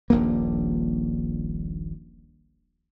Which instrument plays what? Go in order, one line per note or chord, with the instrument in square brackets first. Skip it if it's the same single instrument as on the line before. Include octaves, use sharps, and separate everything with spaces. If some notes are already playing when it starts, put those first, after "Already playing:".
[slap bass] D#1 A#1 G2 A#3